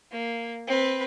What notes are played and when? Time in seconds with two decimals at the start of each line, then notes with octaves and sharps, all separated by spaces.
0.11 A#3
0.67 C4 B4